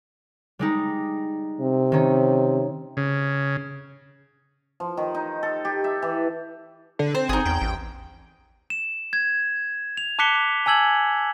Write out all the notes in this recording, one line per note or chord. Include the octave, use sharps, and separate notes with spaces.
G3 G#3 D#4
C3
D#3 C#4
C#3
F3
D#3
D#4
A4
G4
E5
E3
D3
C4 C5
G#1 D#4 G#4
E2 G5
A1
E7
G#6
F7
A5 D6 F#6 B6 C#7 G7
G#5 A5 E6 G#6 F#7